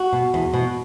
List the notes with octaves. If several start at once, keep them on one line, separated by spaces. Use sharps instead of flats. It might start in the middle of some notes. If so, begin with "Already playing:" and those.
Already playing: F#4
B2
E2
B2